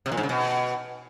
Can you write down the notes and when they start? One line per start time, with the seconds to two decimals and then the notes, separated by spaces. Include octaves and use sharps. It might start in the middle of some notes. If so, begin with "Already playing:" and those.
0.06 C3
0.12 A#2
0.17 G#2
0.23 C#3
0.29 B2